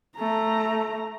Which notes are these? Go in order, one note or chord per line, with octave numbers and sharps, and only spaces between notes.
A3 A#5